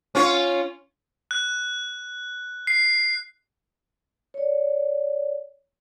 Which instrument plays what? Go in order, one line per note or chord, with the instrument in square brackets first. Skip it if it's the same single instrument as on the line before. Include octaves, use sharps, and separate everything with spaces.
[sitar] C#4 F4 C#5
[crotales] F#6
C7
[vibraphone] C#5 D5